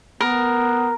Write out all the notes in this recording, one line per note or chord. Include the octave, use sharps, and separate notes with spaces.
B3 A#4